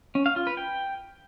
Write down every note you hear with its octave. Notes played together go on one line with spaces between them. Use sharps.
C#4
F5
F4
B4
G5